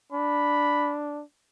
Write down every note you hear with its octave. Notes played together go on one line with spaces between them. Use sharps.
D4 B5